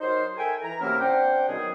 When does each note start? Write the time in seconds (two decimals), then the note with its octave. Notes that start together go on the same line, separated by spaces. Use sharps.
0.01 F#3 D#4 A#4 C5
0.37 A4 A#4 E5 G5 G#5
0.62 E3 A#5
0.80 C3 F#3 A#3 C#4 E4 A#4
1.00 C4 D4 C5 F#5 G5
1.48 B2 D#3 F#3 C#4 G#4